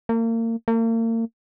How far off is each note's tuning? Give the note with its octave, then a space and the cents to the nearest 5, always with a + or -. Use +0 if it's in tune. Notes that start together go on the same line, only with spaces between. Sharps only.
A#3 -35
A#3 -40